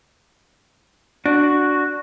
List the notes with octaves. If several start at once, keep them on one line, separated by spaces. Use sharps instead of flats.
D4 F#4